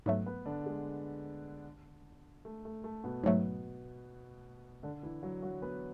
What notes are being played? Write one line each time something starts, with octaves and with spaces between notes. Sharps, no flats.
G#2 F#3 A3 B3 B4
B3 B4
D3 D4
G#3
A3
A3
A3
B2 B3
G#2 F#3 A3
D3 D4
E3 E4
F#3 F#4
F#3 F#4
B3 B4